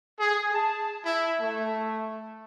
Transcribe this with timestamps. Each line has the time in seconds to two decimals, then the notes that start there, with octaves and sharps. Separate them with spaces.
0.19 G#4
0.53 A5
1.03 E4
1.39 A3